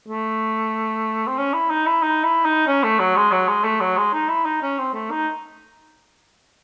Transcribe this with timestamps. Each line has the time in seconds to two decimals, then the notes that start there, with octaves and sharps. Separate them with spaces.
0.08 A3
1.27 C4
1.38 C#4
1.53 E4
1.70 D#4
1.87 E4
2.02 D#4
2.24 E4
2.45 D#4
2.67 C#4
2.83 A3
2.99 F#3
3.16 G#3
3.31 F#3
3.48 G#3
3.64 A3
3.80 F#3
3.97 G#3
4.13 D#4
4.29 E4
4.45 D#4
4.62 C#4
4.78 C4
4.93 A3
5.10 D#4